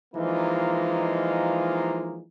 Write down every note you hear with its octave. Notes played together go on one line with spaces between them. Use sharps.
E3 F3 G#3 A#3 D#4 F4